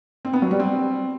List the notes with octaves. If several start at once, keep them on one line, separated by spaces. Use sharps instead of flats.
C4
B3
F#3
G3
C4